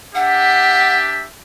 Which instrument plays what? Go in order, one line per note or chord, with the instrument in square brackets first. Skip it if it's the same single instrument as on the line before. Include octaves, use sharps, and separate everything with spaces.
[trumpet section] D4 G4 E5 [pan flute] F#5